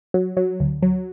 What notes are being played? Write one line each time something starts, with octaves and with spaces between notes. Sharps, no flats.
F#3
F#3
D2
F#3